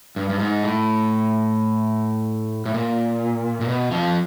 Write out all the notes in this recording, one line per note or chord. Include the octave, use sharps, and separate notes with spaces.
G2
G2
G#2
A2
A2
A#2
A#2
B2
F2 F3